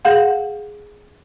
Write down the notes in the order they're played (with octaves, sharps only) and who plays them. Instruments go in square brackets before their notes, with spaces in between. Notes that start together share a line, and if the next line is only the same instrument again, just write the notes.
[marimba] G#4 F5 F#5